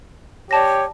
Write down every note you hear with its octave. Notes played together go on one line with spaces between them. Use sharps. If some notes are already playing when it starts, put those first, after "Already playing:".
G4 C#5 D5 A5 A#6